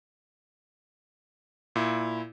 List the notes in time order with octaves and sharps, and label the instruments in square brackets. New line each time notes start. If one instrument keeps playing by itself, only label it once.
[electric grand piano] A#2 E4